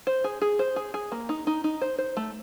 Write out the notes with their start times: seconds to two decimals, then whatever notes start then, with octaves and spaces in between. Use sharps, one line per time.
0.07 C5
0.24 G#4
0.41 G#4
0.59 C5
0.76 G#4
0.94 G#4
1.12 A#3
1.29 D#4
1.47 D#4
1.64 D#4
1.81 C5
1.98 C5
2.17 A3